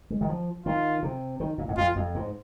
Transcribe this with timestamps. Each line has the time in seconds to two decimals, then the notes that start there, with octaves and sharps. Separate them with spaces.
0.10 G#3
0.21 D#3
0.28 F3
0.66 D#3 F4
1.03 C3
1.40 D#3
1.58 A#2
1.68 G#2
1.77 F2 F4
1.96 F2
2.15 G#2